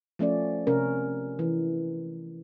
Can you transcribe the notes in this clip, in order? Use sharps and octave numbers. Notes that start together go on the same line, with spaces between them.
F3 A3 C#4 D5
C3 C#4 A#4
E3